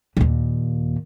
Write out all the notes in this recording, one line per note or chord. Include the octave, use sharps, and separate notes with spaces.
D#2 A#2